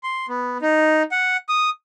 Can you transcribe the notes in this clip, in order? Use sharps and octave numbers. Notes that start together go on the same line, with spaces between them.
C6
B3
D#4
F#5
D#6